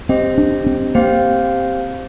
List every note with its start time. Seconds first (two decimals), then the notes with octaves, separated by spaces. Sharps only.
0.09 C4 G4 C5 D#5
0.38 D4
0.66 C4
0.95 A#3 C4 G4 C5 F5